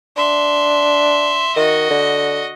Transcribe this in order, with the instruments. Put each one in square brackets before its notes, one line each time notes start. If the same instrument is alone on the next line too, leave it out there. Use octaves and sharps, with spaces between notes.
[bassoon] D4 [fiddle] E5 C6
[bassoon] D#3 [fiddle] F#4 D#5
[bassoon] D3